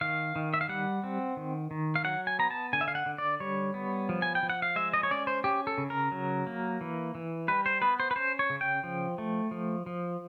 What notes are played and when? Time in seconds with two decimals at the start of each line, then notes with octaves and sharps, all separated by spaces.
0.01 D#3 F5
0.36 D#3
0.54 E5
0.61 F5
0.69 G3 F#5
1.04 C4
1.37 D#3
1.71 D#3
1.96 F5
2.04 F#3 F#5
2.27 G#5
2.39 B3 A#5
2.51 A5
2.73 D3 G#5
2.81 E5
2.88 F5
2.95 F#5
3.06 D3
3.18 D5
3.40 G3 C#5
3.74 B3
4.09 F3
4.22 G#5
4.35 G5
4.43 F3
4.50 F#5
4.62 F5
4.76 G#3 E5
4.94 D#5
5.03 C#5
5.11 C#4 D5
5.27 C5
5.44 C#4 G4
5.67 A4
5.78 C#3
5.90 A#4
6.12 F#3
6.47 A#3
6.81 E3
7.15 E3
7.48 G3 B4
7.66 C5
7.82 B3 B4
8.00 C5
8.11 B4
8.16 C#4 C5
8.39 C#5
8.50 C#3
8.61 G5
8.84 F3
9.18 A3
9.51 F3
9.86 F3